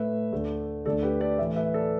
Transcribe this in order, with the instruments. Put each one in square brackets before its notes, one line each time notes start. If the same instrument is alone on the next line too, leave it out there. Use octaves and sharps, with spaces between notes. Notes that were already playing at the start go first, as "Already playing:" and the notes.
Already playing: [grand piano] A2 A3 B4 E5
D2 D3 A3
D2 D3 A3 A4 D5
G4 B4
A4 D5
A2 E3 A3 B4 E5
B4 E5
A4 D5